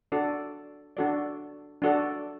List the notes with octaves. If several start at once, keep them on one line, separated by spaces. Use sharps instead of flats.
D4 F#4 A4 D5
D4 F#4 A4 D5
D4 F#4 A4 D5